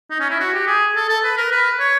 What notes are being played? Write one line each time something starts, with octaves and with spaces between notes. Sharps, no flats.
D#4
C#4
E4
F#4
G4
G#4
A4
A4
B4
A#4
B4
C#5